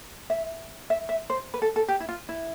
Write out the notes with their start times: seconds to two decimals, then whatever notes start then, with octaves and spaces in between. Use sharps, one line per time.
0.30 E5
0.90 E5
1.09 E5
1.30 C5
1.54 B4
1.62 A4
1.76 A4
1.88 G4
2.00 E4
2.09 F4
2.29 E4